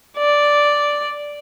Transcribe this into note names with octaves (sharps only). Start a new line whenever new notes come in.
D5